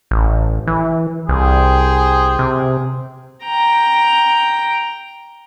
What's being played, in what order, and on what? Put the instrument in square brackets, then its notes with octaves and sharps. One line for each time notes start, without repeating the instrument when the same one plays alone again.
[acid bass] A1
E3
[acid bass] C2 [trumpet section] G#4 C5 G5
[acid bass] C3
[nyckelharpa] G5 A#5